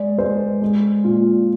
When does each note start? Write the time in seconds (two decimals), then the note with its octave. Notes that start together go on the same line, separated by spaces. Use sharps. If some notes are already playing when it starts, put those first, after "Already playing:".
Already playing: G#3 D5
0.18 G#3 C5
0.62 G#3
1.04 A#2 F4